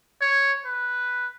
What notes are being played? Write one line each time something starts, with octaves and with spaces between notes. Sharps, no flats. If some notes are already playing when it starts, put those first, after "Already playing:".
C#5
B4